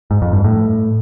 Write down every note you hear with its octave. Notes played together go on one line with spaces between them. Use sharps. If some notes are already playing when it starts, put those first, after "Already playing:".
G#2
F2
G2
A2